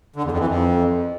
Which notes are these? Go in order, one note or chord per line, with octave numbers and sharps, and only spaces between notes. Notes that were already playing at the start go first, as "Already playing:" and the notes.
D3
E2
F2
E3
F2